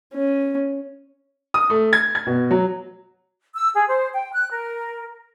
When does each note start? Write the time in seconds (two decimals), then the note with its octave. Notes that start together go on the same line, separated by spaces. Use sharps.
0.15 C#4
1.54 D#6
1.70 A3
1.93 G#6
2.15 G#6
2.27 B2
2.51 F#3
3.55 E6
3.75 G#4
3.88 C5
4.14 G5
4.33 F#6
4.50 A#4